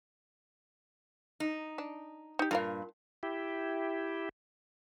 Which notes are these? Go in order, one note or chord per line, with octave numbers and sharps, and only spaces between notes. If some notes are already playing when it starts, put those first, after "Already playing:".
D#4
D4
D#4 G4
G2 A#2 F4 A#4 F5
E4 G4